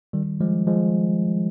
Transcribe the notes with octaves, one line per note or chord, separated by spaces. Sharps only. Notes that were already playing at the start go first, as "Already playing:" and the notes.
D#3 G3
F3 G#3
F3 G#3